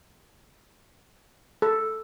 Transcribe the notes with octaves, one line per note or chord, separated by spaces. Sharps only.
A4